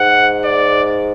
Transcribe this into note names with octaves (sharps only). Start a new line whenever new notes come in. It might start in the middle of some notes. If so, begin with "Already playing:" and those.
Already playing: G#2 F#5
D5